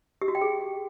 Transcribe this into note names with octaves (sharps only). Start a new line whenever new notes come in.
G4
F#4
G5
G#4